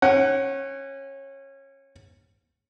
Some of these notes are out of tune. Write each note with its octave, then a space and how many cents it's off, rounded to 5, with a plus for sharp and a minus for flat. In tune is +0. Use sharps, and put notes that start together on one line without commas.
C#4 -25 F#5 +25